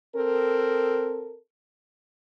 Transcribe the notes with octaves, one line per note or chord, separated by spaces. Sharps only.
C4 A4 A#4